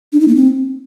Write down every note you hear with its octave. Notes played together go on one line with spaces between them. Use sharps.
D4
D#4
A#3
C4